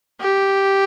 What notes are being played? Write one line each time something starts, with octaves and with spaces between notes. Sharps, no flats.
G4